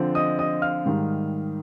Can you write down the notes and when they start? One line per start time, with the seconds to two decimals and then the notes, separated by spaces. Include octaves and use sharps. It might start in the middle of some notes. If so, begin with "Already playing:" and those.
Already playing: D3 F3 C4
0.15 D#5 D#6
0.39 D#5 D#6
0.62 F5 F6
0.86 G#2 D#3 G3